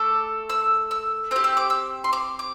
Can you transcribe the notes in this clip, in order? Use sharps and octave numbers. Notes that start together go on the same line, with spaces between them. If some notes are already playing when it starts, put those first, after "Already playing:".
Already playing: A3 A4 D6
E6
E6
C4 G4 G6
E6
D6
E6
C6
D6
D6